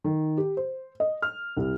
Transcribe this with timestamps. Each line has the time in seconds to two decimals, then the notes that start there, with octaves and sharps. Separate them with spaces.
0.04 D#3
0.38 G4
0.57 C5
1.00 D#5
1.22 F6
1.57 C2